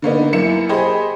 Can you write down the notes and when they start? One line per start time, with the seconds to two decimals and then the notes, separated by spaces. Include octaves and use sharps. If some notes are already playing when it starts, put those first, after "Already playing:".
0.02 D3 A#3 B3 D#4
0.33 F#2 A#3 E4 C#7 E7
0.69 G4 G#4 C5 D#5 B5